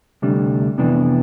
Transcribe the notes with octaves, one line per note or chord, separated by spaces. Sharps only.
D2 C3 G3 D4
F2 C3 E3 B3 D4